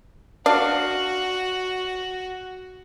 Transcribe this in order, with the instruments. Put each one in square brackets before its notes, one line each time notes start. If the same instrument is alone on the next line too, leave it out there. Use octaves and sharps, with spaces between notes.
[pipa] D4 D5 F5 [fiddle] F#4